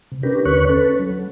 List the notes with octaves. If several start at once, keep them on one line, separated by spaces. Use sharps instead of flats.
C3
C#4 D4 G4 A#4 B4
D#2 D3 B4 C#5 C#6 F#6
C#4 A4 B4
F#3